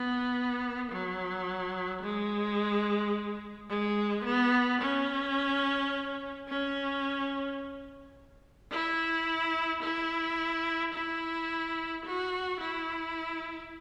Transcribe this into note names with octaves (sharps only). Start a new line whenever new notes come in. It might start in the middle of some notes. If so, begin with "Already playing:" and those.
Already playing: B3
F#3
G#3
G#3
B3
C#4
C#4
E4
E4
E4
F#4
E4